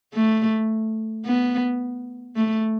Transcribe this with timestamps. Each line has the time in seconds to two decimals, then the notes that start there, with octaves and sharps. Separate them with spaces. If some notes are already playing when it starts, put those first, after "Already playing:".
0.14 A3
1.25 B3
2.36 A3